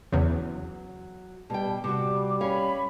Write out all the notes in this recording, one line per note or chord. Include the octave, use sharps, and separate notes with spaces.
E2 C#3 F#3
B2 G3 G5 A5
C3 G3 F#4 D6
C#4 C#5 F5 B5